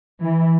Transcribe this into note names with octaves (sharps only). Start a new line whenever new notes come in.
E3